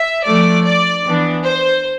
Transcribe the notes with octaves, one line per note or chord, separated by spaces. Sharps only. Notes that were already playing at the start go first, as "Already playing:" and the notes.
Already playing: E5
F3 A3 D4 D5
D5
E3 B3 D4
C5